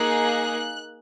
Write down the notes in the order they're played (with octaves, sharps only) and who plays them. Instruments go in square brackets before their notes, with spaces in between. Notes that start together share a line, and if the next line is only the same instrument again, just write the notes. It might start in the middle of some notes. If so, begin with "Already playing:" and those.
Already playing: [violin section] A#3 D#4 G#4 F#6